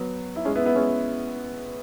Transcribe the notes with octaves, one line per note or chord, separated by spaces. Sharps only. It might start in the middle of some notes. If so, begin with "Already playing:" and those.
Already playing: F#3 B3
E4
G#3 C#4
B3 E4
B3 E4
G#3 C#4